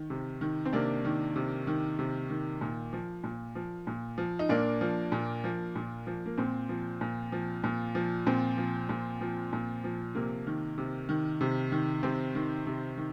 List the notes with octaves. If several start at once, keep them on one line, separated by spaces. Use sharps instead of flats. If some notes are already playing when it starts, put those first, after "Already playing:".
Already playing: D#3
C3
D#3
C4
C3 A#3 D4
D#3
C3
D#3
C3
D#3
A#2
F3
A#2
F3
A#2
F3
D#4
A#2 A#3 D4
F3
A#2
F3
A#2
F3
A#3
A#2 C4
F3
A#2
F3
A#2
F3
A#2 C4
F3
A#2
F3
A#2
F3
C3 A#3
D#3
C3
D#3
C3
D#3
C3 C4
D#3
C3
D#3